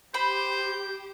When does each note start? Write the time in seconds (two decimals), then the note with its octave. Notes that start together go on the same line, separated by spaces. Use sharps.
0.14 G4 C5 B5 G6